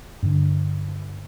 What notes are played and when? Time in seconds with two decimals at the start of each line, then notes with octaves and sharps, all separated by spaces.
0.23 G2 D3